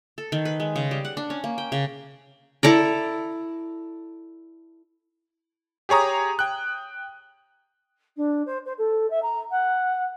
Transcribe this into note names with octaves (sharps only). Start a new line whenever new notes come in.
A4
D#3
B4
G#3
C#3
G3
F#5
D4
C#4
A#3
G5
C#3
E4 A4 D5 A#5
G4 G#4 C#5 A#5 D#6
G5 F#6
D4
C5
C5
A4
E5
A#5
F#5